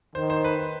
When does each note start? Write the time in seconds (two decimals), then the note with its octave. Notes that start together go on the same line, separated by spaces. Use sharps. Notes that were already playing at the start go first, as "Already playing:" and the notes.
0.15 D#3 C5
0.30 C5
0.44 B4